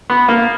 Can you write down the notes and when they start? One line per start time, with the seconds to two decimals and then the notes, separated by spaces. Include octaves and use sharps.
0.10 B3
0.29 A#3